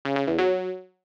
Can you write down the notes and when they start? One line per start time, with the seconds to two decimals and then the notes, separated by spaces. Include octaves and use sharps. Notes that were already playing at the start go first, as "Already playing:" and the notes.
0.05 C#3
0.16 C#3
0.27 E2
0.38 F#3